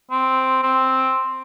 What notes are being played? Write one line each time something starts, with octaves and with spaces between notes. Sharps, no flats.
C4
C4